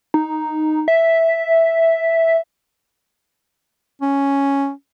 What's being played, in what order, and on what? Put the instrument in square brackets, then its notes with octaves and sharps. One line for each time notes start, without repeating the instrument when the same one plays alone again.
[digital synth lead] D#4
E5
[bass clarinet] C#4